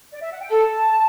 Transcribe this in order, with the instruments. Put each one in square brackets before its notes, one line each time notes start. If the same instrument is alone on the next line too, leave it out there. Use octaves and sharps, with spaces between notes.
[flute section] D5
E5
F#5
G5
[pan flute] A4 [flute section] A5